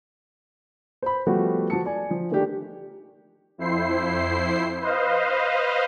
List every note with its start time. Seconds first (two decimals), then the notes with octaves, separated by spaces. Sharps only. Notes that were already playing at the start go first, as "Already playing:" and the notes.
1.02 C5 B5
1.27 F3 G3 A3 B3 F#4
1.70 F3 F#4 A5 C#7
1.86 D5 G#5
2.11 F3
2.31 D#3 A3 A#3 D4 G4 A#4
3.58 F2 E4 C5 C7
4.80 B4 C5 D#5 F5